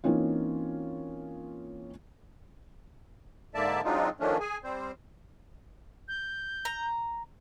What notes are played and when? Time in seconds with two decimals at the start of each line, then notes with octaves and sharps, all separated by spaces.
0.04 E3 A#3 C4 C#4 D#4 F4
3.55 G#2 D3 A#3 D5 E5 A5
3.84 F#3 G#3 C4 D4 D#4 F4
4.20 D#3 F3 A3 C#4 D4
4.40 G#4 G#5
4.64 G3 C4 C5
6.08 G6
6.65 A#5